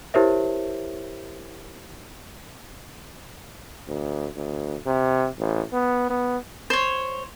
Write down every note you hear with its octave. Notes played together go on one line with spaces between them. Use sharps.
E4 G4 A#4 C5 C#5 E5
D2
D2
C3
A1
B3
B3
C5 C#5